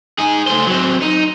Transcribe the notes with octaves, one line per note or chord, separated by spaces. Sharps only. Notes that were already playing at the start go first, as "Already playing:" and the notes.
D#4 G#4
A3 C5
F#3 C4
D#4